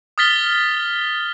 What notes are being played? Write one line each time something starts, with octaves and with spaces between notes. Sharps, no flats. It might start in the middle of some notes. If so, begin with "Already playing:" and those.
D#6 F6 A6 B6 G7